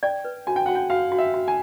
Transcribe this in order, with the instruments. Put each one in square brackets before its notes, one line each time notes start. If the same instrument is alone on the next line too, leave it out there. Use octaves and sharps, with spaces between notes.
[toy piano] D5 [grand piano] G5
[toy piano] B4
[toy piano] F#4 [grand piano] G#5
[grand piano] G5
[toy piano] F#4 [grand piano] F#5
[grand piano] G5
[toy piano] F#4 [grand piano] F5
[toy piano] F#4
[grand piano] E5
[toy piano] F#4
[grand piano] G#5